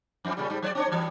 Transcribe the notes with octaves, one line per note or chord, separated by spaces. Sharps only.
F2 D#3 F3
A#2 C#3 G3
G#2 G3
F#3 C#5 D5
C4 D4 C#5
G2 E3